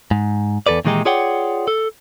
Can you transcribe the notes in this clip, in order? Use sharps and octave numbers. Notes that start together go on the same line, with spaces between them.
G#2
E2 G#2 A4 B4 D5
A#2 D#3 E3 G#3 D#4 G4
F4 G#4 C#5 D5 F#5 G5
A4